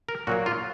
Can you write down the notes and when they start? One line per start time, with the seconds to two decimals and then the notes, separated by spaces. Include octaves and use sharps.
0.09 A#4
0.27 A#2 F#3 A#3 F#4
0.46 F4